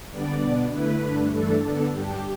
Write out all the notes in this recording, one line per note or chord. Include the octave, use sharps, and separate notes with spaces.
D3 G3 B3 D4 D5
B2 B3 D4
D3 A3 E4 B4
G2 D3 A3 D4
G2 E3 A3 D4 A4
D3 B3 D4 A4
G2 G3 D4 G4